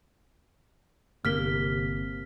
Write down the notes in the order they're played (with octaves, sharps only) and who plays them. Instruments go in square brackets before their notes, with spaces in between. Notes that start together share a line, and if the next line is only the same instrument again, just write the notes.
[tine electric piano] G1 [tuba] C3 [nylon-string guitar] A#3 [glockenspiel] F6 B6 G7